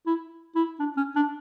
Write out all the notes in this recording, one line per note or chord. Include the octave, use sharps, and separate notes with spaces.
E4
E4
D4
C#4
D4